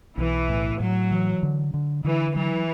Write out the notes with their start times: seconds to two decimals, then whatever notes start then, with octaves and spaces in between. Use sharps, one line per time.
0.18 B1 E3
0.49 A2
0.80 A2 F#3
1.11 E3
1.43 D3
1.74 D3
2.04 D3 E3
2.36 E3 F#3